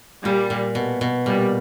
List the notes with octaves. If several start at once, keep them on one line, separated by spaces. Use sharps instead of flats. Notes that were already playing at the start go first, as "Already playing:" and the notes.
A#2 G3
A#2
B2
B2
A#2 G3